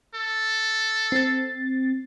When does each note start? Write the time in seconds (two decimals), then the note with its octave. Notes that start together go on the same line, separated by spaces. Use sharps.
0.14 A4
1.12 C4 A6